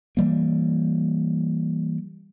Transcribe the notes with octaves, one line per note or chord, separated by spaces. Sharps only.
E3 G3 A#3